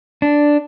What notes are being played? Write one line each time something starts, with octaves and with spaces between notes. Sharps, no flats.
D4